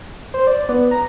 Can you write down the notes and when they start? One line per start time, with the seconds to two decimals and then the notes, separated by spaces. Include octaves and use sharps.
0.34 C5
0.47 D5
0.69 B3
0.91 A#5